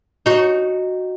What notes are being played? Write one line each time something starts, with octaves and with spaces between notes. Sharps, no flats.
D#4 F#4